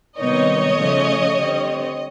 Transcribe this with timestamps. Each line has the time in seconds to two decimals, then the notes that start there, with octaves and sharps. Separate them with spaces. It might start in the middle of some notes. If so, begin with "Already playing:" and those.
0.19 C3 D#3 G3 B3 D#4 C#5 D#5
0.77 C#3 F3 A3 C#4
1.36 D3 G3 C4